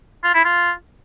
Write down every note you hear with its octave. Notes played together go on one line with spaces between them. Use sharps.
F4
E4
F4